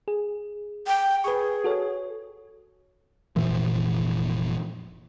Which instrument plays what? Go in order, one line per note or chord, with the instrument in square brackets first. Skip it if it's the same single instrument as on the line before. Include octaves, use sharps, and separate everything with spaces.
[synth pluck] G#4
[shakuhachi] G5
[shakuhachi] G#4 [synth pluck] B4 C#6
[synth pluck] F#4 A4 C#5
[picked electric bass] F1 A#2 E3 F3